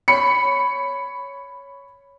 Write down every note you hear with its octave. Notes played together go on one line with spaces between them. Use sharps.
C#5 B5 C#7